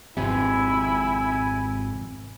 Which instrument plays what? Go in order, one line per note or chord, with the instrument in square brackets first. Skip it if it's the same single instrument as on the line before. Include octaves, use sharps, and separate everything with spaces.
[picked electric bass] G#1 F2 C3 [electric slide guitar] G#2 C4 E5 [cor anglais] E4 [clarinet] G#5